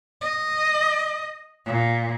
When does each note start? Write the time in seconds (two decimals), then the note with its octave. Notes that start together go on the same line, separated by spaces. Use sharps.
0.21 D#5
1.66 A#2